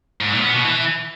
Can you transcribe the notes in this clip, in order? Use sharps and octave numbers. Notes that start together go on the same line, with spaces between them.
G#2
A#2
B3
B2
E3